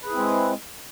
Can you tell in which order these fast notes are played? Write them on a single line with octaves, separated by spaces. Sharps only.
B4 G#4 E4 C4 G#3